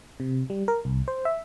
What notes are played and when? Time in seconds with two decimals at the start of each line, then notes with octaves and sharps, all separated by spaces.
0.20 C3
0.50 G3
0.68 A#4
0.85 C2
1.08 C5
1.25 E5